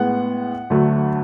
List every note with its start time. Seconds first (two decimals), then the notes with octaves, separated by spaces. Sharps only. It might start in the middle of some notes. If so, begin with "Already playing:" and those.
Already playing: A2 G#3 B3 F#5
0.70 D2 D3 F#3 A3